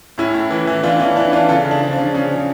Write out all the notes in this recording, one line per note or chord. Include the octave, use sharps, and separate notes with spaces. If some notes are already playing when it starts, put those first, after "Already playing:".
A2 C#4 E4
A2
E3
E3
E3 D4 F4
E3 C#4
E3 D4
E3 D4 F4
C#3 F4 A4
C#3
D4
F3
D4
C#3
C#3 C#4
F3